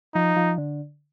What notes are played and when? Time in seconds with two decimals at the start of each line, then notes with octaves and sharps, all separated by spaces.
0.15 F3 D#4
0.36 F3
0.58 D3